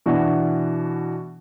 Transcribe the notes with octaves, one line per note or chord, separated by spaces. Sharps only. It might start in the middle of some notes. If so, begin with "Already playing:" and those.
B2 E3 D4 F#4